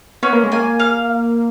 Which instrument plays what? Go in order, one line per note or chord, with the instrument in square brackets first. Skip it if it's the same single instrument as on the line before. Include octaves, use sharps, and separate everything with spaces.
[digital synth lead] B3 [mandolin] C#4
[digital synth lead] A#3
G#3
[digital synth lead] A#3 [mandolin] G#5
[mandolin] F5